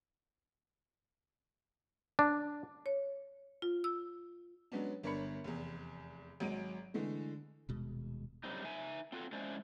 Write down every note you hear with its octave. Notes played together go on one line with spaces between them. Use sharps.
D4
C#5
F4
E6
F#3 G#3 B3 C#4 D4
G1 D4 A#4 C#5 B5 C#7
F1 E2
G#1 F#3 G#3 D7 D#7
D3 E3 G#3 A3
D#1 B2 G#3
F#2 G3 C4 D#4
D#4 E5 G#5
C4 F4 F#4 G#4 A4
G#3 C#4 D4 E4 C5 D5